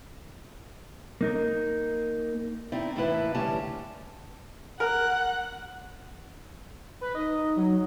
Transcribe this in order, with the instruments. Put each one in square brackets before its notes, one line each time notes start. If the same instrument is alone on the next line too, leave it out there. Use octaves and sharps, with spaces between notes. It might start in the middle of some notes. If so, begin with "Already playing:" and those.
[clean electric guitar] A#3 D#4 A#4
[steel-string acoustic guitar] C4 D#4 E4 D5
A2 E3 A#3 E4 B4 A5
A2 D3 G3 C#4 A5
[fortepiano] A#4 [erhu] F#5
[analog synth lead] B4
[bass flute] D#4 [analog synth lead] D#5
[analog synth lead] F#3